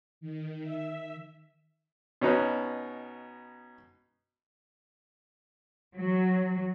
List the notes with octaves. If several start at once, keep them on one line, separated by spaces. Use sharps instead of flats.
D#3
E5
B2 C#4 D#4 B4
F#3